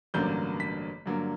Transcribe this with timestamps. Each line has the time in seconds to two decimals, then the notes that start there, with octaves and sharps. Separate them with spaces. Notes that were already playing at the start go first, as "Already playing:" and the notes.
0.14 A1 G2 D3 F#3 A#3 G6
0.60 B6
1.06 G2 D3 F#3 A#3